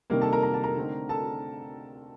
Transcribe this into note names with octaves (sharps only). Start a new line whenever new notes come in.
C3 D#3 G3 A#3 A#4
A4 A5
A#4 A#5
A#5
A5
A#4 A#5
D3 A3 C4 D#4
A4 A5